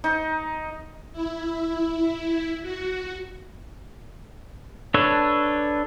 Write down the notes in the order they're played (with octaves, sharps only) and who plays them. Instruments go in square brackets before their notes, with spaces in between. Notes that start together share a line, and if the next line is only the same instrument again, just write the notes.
[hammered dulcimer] D#4
[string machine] E4
F#4
[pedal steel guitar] D4 A4 B4 C#5